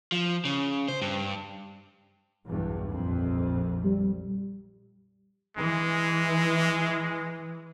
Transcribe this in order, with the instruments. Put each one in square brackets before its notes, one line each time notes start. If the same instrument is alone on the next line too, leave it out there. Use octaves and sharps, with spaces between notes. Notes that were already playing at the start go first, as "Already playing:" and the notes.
[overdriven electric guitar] F3
C#3
C5
G2
[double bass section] B1 E2 G2
A#1 F2
[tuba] G3
[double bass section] E3 [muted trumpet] G#3